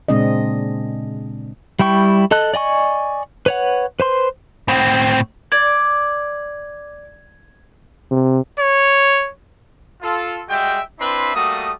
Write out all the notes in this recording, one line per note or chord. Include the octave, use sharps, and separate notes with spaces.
A#2 C#3 G#3 C4 D4 D#5
G3 E4 G5 C#6
A4 D#5 A5 F#6
D5 D#5 G#5 C#6
B4 C#5 F#5
B4 C5 C6
A2 C4
D5 G#6
C3
C#5
F4 A4
G3 G#3 F#4 E5 G5
C4 D4 E4 B4 E5 C6
G3 A3 A#3 F#4 D#6